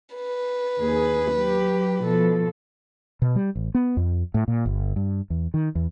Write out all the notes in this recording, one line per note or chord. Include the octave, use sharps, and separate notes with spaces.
B4
D#2 G#4
F#3 G4
B2 F3 A4
B2
G3
A1
B3
F2
A2
A#2
G1
G2
E2
D#3
E2